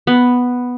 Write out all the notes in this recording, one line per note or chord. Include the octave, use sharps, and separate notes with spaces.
B3